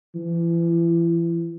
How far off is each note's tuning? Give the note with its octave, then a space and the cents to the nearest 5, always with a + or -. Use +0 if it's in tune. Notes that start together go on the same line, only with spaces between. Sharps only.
E3 +35